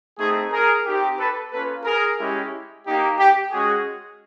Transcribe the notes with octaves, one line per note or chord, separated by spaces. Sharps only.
A3 C4 D#4 G#4
G#4 A#4
C4 D#4 G4
A4 B4
A#3 C#4 F4 A4 B4
G#4 A#4
G#3 C#4 E4 G4
A#3 D#4 G4
G4
G#3 C#4 F#4 G#4